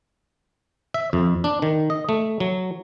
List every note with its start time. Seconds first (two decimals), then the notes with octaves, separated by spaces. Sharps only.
0.94 E5
1.13 F2
1.44 D4
1.62 D#3
1.90 D#5
2.09 A3
2.40 F#3